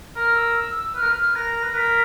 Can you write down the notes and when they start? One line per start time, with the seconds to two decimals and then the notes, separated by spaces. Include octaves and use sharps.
0.16 A#4 F6
0.35 E6
0.56 E6
0.75 E6
0.95 B4 F6
1.03 A#4
1.10 B4
1.16 F6
1.35 A#4 A#6
1.55 A#6
1.63 B4
1.75 A#4 B6